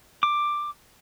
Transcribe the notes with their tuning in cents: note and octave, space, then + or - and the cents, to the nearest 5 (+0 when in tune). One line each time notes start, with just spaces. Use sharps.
D6 +10